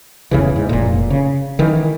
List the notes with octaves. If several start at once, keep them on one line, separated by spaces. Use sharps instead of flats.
D#1 E2 C#3 E3
G#2
F1 A#2
C#3
D#3 E3